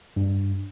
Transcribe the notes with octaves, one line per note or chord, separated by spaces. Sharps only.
G2